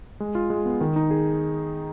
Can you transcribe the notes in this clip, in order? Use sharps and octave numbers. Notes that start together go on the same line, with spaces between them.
G#3
F4
G#3
B3
D#3
D#4
G#4